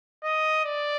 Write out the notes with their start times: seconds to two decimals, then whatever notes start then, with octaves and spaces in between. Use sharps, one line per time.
0.23 D#5
0.65 D5